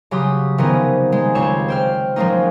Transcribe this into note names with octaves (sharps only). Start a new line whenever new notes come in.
C#3 F#3 G4 C6 D#6
C3 D#3 F3 B3 C#4 D#4
G#3
C#2 C4 C#5 E7
C5 G5 F6
F3 F#3 G#3 A#3 C#4 D#4